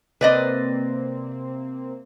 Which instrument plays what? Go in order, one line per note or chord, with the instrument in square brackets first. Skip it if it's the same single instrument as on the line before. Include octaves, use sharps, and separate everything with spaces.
[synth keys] C3 A#3 C4 [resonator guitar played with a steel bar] B4 D5 D#5